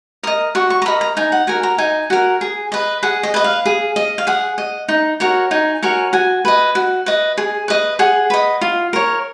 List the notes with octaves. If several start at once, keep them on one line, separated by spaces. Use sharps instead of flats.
A#4 D#5 D#6
F#4 C#6
C#6
A#5
A#4 D#5 B5
A#5
D#4 G#5
F#5
F#4 A#4 G#5
A#5
D#4 G#5
F#4 A#4
G#4
B4 D#5
G#4 F#5
D#5
B4 D#5
F5
G#4
D#5
F5
G#4 F#5
D#5
D#4
F#4 A#4 C#5
D#4 G#5
F#4 A#4 C#5 G#5
F#4 G#5
B4 D#5
F#4
B4 D#5
G#4
B4 D#5
G#4 F#5
B4 D#5
F4
A#4 C#5